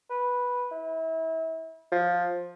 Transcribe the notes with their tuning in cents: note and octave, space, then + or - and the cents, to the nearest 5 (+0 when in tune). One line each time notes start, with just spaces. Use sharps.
B4 -5
E4 -30
F3 +10